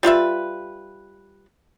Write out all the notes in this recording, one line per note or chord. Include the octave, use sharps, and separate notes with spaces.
G3 F4 B4 E5